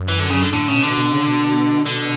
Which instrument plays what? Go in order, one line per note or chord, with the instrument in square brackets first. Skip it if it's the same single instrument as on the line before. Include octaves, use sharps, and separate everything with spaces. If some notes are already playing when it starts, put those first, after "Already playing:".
Already playing: [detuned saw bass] F#2
[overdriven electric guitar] E3
D3
C#3
D3
[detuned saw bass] A2 [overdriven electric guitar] D3
[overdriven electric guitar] C#3
[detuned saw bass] B2
[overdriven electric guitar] D3
[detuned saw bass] B2
C#3
B2
[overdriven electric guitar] D3